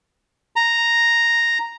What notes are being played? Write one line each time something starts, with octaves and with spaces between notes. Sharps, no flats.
A#5